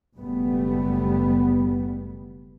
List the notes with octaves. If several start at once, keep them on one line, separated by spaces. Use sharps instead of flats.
F#1 B2 G3 A3 B3